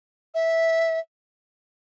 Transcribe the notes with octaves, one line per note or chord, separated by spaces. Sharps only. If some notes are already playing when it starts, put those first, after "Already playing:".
E5